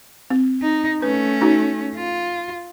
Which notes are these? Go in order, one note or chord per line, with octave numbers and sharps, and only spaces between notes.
C4
D#4
A3 C#4 B4
D#4 F#4
F4